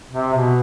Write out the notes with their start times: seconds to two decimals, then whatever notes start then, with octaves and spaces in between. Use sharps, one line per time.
0.10 C3
0.34 B2